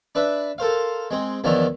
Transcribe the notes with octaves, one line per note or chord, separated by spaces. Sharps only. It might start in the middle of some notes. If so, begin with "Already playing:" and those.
D4 B4 E5
A4 A#4 C5 F5
G#3 C4
E2 D#3 F3 F#3 D4 E4